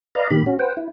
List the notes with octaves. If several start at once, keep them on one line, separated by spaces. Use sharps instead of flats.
B4 D5 D#5 F5 A#5
A#2 D#3 G4 B5
C#4 F#4
B4 C5 F#5 G5
E4